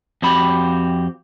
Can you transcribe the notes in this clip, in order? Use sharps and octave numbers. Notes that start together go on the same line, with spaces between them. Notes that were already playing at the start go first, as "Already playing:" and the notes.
F2 C4 F#4 G4 B5